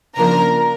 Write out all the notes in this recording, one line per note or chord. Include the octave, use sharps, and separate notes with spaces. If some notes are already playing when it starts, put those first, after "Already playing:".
C#3 F3 A#3 D4 F4 A#4 A#5